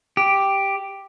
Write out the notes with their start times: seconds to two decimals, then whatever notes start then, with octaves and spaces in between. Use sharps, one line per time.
0.17 G4